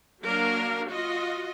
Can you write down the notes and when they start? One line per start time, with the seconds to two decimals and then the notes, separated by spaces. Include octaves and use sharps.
0.23 F#3 A#3 D4 A#4 F5
0.89 F4 F#4 D#5